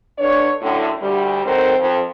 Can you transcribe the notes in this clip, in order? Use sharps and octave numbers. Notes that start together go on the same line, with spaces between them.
D3 D4 B4 C#5
F#2 A2 D3
D2 G3
D#3 F#3 C4 A4 A#4 C5
F2